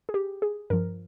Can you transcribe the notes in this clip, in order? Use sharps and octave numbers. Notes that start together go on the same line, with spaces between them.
G#4
G4
G#4
G2 F3 A#4